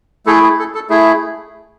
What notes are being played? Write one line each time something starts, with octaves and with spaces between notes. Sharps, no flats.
A3 E4 G#4 A4
G#4
A4
A4
A3 E4 G#4